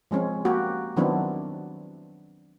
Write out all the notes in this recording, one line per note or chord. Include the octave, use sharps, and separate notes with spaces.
F3 G#3 C4 C#4
A#3 F#4 G4
D#3 F#3 B3 C4 D4 E4